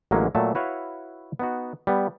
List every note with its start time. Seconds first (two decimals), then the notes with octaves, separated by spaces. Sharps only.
0.11 A1 D3 F#3 G#3 A#3 C#4
0.35 A#2 F#3 A3 A5
0.55 E4 F#4 B4 C#5 E5 F5
1.39 B3 D#4 F#4
1.87 G3 B3